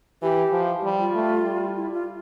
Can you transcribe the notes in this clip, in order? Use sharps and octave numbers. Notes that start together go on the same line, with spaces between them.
E3 G4
F3
G3
F4
A3
G3
E4
F4